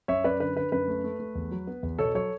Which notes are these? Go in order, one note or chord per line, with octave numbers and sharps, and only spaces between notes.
F#2 C#5 E5
F#2 B4 D5
D3 B4
D3 B4
F#2 B4
A3
A3
A3
E2
F#3
B3
E2
B2 A4 C#5
F#3 A4 C#5